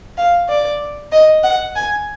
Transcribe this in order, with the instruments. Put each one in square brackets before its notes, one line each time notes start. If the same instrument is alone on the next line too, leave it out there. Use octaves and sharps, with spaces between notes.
[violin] F5
D5
D#5
F#5
G#5